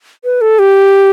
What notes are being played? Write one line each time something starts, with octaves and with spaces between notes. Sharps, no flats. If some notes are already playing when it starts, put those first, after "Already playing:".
B4
A4
G4